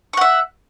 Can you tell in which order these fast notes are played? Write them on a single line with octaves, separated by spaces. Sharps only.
C#6 F#5 E5